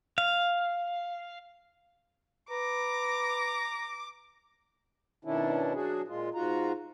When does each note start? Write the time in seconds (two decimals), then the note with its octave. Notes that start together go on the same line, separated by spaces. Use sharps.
0.18 F5
2.51 B4 A#5 D6
5.25 B2 D#3 C#4 D4 E4
5.74 F#3 D4 F#4 G#4
6.08 A#2 G#3 F4
6.34 G#2 F4 F#4 A#5